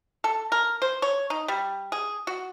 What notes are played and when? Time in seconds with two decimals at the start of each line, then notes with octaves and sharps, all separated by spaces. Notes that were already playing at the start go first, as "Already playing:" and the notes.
0.24 A4
0.52 A#4
0.82 C5
1.02 C#5
1.30 D#4
1.48 G3
1.92 G#4
2.27 F#4